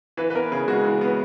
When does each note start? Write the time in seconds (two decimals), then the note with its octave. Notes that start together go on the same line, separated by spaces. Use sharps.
0.17 E3 B4
0.30 B4
0.35 B3 A#4
0.52 C#3 G#4
0.68 G#3 F#4
0.85 E3
1.01 B3